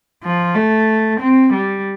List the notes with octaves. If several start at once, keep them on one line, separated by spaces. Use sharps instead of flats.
F3
A3
C4
G3